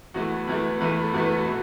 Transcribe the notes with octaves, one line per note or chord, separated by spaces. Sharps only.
E2 E3 A3 F#4
E2 E3 A3
E2 E3 A3 B4
A4
E2 E3 A3 F#4
B4
A4
F#4
B2